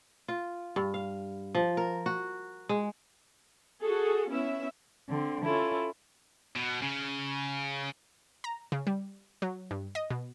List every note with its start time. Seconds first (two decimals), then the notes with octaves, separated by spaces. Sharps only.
0.28 F4
0.76 G2
0.94 F5
1.55 F3
1.77 A#4
2.06 F#4
2.69 G#3
3.81 F#4 G#4 A4
4.29 B3 C#4 E4 E5
5.08 D3 C4
5.45 C#4 E4 F4 A4
6.56 B2
6.82 C#3
8.44 A#5
8.72 C#3
8.87 G3
9.42 F#3
9.71 G2
9.95 D#5
10.10 B2